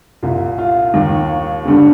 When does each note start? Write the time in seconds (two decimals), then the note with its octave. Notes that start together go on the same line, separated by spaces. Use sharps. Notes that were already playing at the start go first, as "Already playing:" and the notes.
0.23 C2 A#2
0.58 F4
0.94 D#2 D#3
1.66 G1 G2 D3